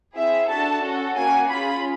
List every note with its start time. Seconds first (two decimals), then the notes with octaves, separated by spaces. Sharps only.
0.15 C4 E4 G#4 E5
0.48 D4 F#4 A4 A5
0.82 C#4 F#4 A4
1.15 A#3 C#4 F#4 G#5
1.49 C#4 F4 G#4 B5